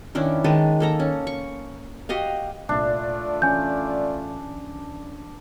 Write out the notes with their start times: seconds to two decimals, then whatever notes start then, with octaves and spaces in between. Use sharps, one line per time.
0.15 D#3 C#4 D4 E4
0.44 D#3 G#3 B4 A5
0.80 A#3 A4 A#5
1.00 C#4
1.27 C#6
2.09 F#4 G4 D#5 F5
2.69 C2 A#2 A3 D4 F4 D5 E5
3.42 E3 C#4 G#5 G6